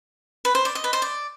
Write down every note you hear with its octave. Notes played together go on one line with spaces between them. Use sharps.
B4
C5
D5
D#5
B4
C5
D5